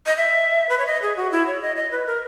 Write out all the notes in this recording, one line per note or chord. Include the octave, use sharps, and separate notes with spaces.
D#5
E5
B4
C#5
D#5
G#4
F#4
E4
C#5
D#5
D#5
B4
A#4